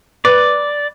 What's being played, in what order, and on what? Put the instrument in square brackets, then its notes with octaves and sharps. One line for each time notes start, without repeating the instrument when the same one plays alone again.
[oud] B4 [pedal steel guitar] D5